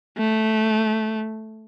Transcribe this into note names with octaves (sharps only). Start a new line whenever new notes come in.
A3